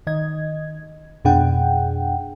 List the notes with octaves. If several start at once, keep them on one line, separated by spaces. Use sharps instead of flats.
D#3 D#5 G#6
F2 B2 D4 G#4 F#5 G5